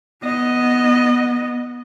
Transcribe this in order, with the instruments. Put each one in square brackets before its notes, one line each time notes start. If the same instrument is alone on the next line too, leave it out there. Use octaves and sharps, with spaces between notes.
[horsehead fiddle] B3 D#5